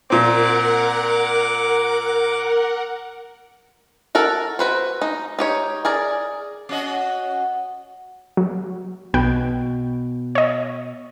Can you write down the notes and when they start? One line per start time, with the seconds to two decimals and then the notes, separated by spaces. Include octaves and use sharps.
0.10 A#2 C4 A#4 F#5 D6
4.15 F#4 A4 A#4
4.59 F#4 B4 C5
5.02 D#4
5.39 D#4 G4 C#5
5.85 G#4 A#4 D5
6.69 C#4 F#4 D#5
8.37 F#3
9.14 B1 B2 B4 G5
10.35 C#5 D#5